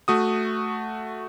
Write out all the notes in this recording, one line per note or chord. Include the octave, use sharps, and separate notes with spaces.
A3 F#4 D#6